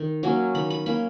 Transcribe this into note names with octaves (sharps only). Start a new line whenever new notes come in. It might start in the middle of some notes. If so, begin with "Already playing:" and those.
Already playing: D#3
F#3 A#3 C#4
D#3 B5
B5
A#3 C#4 B5